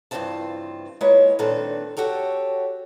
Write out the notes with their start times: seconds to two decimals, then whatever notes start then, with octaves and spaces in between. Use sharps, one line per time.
0.11 G2 C#3 E3 C4 F4 A5
1.01 G#3 A#3 E4 F4 B4 C#5
1.39 A#2 D#3 C4 D4 A4 B4
1.97 F#4 G4 A4 C#5